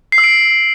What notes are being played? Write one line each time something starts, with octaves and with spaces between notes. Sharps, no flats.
C7
E6
D7